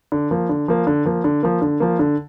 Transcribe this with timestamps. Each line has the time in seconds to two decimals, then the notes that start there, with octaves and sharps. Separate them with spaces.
0.12 D3
0.31 F3 A#3
0.49 D3
0.68 F3 A#3
0.87 D3
1.05 F3 A#3
1.24 D3
1.43 F3 A#3
1.62 D3
1.80 F3 A#3
1.99 D3